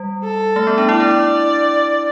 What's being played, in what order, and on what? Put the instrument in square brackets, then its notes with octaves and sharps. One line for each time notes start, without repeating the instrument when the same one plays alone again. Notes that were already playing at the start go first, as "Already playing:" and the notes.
Already playing: [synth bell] G3
[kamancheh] A4
[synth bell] A3
B3
D4
[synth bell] E4 [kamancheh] D5
[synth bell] D4
E4